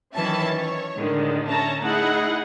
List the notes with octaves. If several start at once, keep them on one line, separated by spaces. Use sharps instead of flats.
D#3 E3 F#3 C#4 E5 A5
C#5
A2 D3 D#3 G#3
C#4 E5 A5 A#5
A3 D#4 E4 G#4 D#5 F#5